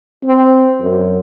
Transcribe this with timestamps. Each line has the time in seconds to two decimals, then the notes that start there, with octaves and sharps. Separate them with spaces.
0.23 C4
0.81 F#2